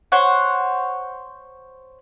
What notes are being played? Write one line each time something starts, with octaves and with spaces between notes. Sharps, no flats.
C5 C#5 F#5